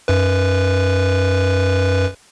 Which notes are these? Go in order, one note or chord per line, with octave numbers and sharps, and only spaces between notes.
F#2 B4